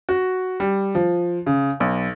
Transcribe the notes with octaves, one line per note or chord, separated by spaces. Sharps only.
F#4
G3
F3
C#3
B1